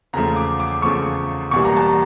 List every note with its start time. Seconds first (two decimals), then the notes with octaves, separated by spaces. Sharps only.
0.13 E2 C#3 F3 A3 A#5
0.36 D6
0.60 D6
0.82 E2 C#3 F3 A3 C#6
1.51 E1 E2 E3 G3 A#3 C#6
1.65 A#5
1.77 A5
1.89 A#5